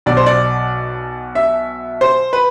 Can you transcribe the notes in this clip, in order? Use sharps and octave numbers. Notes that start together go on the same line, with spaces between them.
B1 B2 F#3 D5
C5
D5
E5
C5
B4